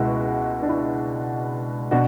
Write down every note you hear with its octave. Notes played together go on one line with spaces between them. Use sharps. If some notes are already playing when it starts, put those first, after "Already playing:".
Already playing: C#2 B2 G#3 E4 F#4
D4
E4
B2 D4 F#4